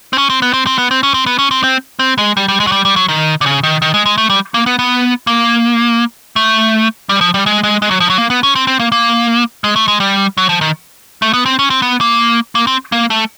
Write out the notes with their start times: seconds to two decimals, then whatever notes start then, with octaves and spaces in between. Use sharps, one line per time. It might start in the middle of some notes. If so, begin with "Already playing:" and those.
0.13 C4
0.18 C#4
0.30 C4
0.42 B3
0.53 C4
0.67 C4
0.78 B3
0.91 C4
1.03 C#4
1.14 C4
1.26 B3
1.39 C#4
1.51 C4
1.64 C4
1.99 C4
2.18 G#3
2.37 G3
2.48 G3
2.60 G#3
2.67 F#3
2.72 G3
2.85 G3
2.96 F#3
3.09 D#3
3.41 D3
3.46 C#3
3.63 D#3
3.82 D#3
3.94 G#3
4.06 G#3
4.18 A3
4.30 G3
4.54 A#3
4.66 B3
4.79 B3
5.27 A#3
6.36 A3
7.09 G3
7.21 F3
7.34 G3
7.46 G#3
7.64 G#3
7.82 G#3
7.91 F#3
8.00 F3
8.10 F#3
8.18 A#3
8.30 B3
8.43 C#4
8.55 C4
8.67 C4
8.80 A#3
8.92 A#3
9.64 G#3
9.76 A3
9.88 G#3
10.00 G3
10.37 F#3
10.49 F3
10.61 D#3
11.22 A3
11.33 B3
11.46 C4
11.59 C#4
11.70 C4
11.82 B3
12.01 A#3
12.55 A#3
12.67 C4
12.92 A#3
13.10 A3